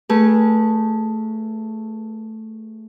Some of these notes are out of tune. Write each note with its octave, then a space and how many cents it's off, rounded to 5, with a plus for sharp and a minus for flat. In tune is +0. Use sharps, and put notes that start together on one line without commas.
A3 +0 G#4 +0 B4 -30